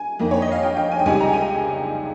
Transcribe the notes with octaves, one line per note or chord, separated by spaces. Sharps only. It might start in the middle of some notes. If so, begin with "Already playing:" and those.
Already playing: G#5
F2 D#3 A#3
C#5
D#5
F5
G5
G5
G#5
G5
C#2 C3 D#3 G3 C#4 G#5
A#5
G5
G#5